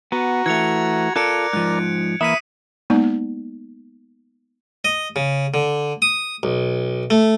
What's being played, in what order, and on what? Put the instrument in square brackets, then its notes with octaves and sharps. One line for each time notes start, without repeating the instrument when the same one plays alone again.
[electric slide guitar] B3 [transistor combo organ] F#4 A#5
[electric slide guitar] E3 A3 [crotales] G#6 C#7 F7
[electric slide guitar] F4 A4 [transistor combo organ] A#4 D5 [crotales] F#6 C#7 D7
[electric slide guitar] G#2 F3 [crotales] F#6
[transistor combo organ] E3 A#3 [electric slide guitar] E5 [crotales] D#6 B6 D#7
[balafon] G#3 A#3 B3 D#4 D5
[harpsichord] D#5
C#3
D3
D#6
B1
A3